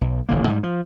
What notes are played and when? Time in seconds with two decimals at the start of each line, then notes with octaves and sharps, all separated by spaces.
0.01 B1
0.29 D#1 A1 D3 A#3
0.48 G#2 G3
0.63 F3